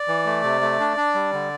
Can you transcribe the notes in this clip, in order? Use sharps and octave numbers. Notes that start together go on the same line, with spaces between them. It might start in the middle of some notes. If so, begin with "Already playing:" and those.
Already playing: D5
E3
A3
C3
A3
D4
D4
G3
D3